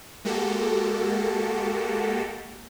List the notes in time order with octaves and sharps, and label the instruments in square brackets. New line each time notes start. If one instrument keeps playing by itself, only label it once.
[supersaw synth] G#3 A#3 F#4 G4 A4